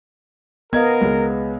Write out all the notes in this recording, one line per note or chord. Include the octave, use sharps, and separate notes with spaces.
B3 A#4 D#5 F5 G#6
C#2 G#3